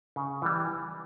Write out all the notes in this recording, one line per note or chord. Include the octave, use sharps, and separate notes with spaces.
C#3
E3 G3